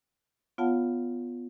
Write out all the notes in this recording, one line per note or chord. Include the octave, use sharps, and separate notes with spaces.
B3 F4 C#5 F5 F#5 A5